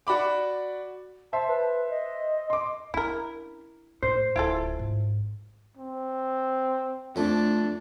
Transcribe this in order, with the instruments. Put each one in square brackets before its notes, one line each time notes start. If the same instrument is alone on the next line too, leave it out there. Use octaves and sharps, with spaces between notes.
[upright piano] F#4 D5 B5 D6
[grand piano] C5 E5 C6 [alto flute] A5
[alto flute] B4
D#5
[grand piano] C6 D6
[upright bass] C#4 D4 [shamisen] E4 A#4
[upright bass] A2 [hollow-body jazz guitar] C5
[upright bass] D1 [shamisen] E4 F4 A4
[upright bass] G#1
[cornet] C4
[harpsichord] F2 A3 [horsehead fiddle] D4